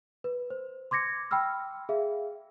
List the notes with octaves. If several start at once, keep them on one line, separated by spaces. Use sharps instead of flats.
B4
C5
C6 D6 G#6 A#6 C#7
G5 B5 E6 F6
G#4 E5 F5